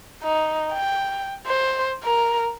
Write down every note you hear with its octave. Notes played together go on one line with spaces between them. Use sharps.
D#4
G5
C5
A#4